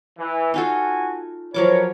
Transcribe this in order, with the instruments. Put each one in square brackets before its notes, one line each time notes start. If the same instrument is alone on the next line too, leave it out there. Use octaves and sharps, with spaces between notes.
[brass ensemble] E3
[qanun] D#4 F4 A4 [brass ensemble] F#4 G#5
[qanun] F3 F#3 D6 [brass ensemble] A#4 B4 C#5